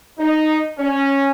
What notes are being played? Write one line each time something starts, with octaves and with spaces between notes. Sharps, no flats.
D#4
C#4